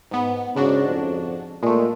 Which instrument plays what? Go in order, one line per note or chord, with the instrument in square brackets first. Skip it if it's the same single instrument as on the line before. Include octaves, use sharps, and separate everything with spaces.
[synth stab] G#2 B3
[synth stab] G#2 D4 F#4 [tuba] C#3
[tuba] F2
[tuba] A#2 [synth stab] G#3 A3